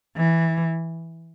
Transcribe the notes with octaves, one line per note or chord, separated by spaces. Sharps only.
E3